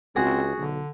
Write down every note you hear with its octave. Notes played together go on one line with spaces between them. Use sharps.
C#2 C4 F#4 G#4
B1 D3